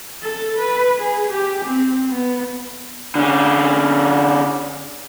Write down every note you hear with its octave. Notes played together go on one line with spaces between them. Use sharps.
A4
B4
G#4
G4
C4
B3
D3 C#4